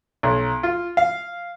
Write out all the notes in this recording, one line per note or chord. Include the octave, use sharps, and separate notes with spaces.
B1
F4
F5